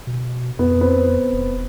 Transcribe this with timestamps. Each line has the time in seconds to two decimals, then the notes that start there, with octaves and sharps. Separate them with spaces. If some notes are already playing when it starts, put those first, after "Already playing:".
0.07 B2
0.59 F2 B3
0.81 B3 C4
1.33 E1